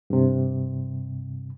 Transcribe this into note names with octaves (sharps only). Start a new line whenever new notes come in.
G2 C3